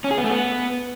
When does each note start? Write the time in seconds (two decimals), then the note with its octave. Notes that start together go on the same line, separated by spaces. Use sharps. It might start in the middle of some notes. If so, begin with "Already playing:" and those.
0.04 C#4
0.11 G#4
0.17 B3
0.24 A3
0.30 B3